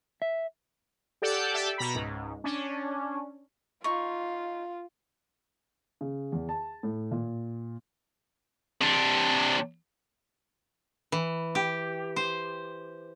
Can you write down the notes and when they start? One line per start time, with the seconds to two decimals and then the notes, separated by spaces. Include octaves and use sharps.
0.22 E5
1.22 G4 A4 D5 F#5 G6
1.53 G4 A4 D5 E5 G5
1.78 B2 A#5 B5
1.95 C#2 G#2
2.44 C#4 D4
3.84 D#4 F4 C#6
6.01 C#3
6.32 E2
6.49 A5
6.83 A2
7.11 A#2
8.81 C3 D4
11.12 E3
11.55 G4
12.16 C5